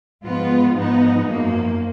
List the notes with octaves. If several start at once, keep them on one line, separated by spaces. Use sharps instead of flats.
G#2 F3 B3 F4
G#2 F3 B3 D#4
F#2 F3 A#3